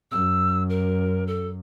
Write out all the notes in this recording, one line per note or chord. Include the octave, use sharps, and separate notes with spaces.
F#2 E6
A#4
A4